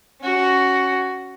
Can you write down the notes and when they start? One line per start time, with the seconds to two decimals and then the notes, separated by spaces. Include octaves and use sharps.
0.21 C#4 F#4